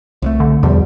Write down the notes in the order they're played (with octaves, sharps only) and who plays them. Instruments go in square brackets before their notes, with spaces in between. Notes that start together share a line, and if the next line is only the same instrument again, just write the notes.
[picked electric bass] C2 G#3 A3
[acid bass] D3
[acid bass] E2 [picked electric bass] B2 F3 G3